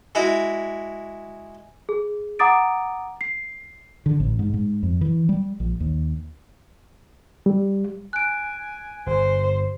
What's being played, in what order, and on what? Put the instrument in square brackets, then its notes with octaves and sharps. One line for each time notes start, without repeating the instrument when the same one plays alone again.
[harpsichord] G#3 E4 F#4
[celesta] G#4
F#5 A#5 D6 D#6 A6 D7
C7
[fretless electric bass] D3
A1
G#2
G#2
F2
E3
G3
A#1
D#2
[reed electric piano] G3
[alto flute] G#5 [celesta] F#6 D7
[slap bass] G1 [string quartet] C5